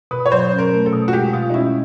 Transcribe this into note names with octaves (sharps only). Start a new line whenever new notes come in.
B2 B4
C#5
F#3 C5
C#4
A#4
A3
A4
B2
F#4
G#3 G4
B2 F4
D#4
C#4 E4